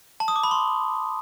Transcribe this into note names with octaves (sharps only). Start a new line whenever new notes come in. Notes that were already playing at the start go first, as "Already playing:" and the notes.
A5
D#6
D6
B5
C6